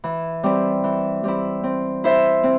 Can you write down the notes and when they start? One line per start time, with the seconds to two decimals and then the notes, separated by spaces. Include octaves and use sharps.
0.04 E3
0.43 G3 C4 E4
0.84 E3
1.24 G3 C4 E4
1.64 C4
2.04 E4 C5 E5
2.43 C4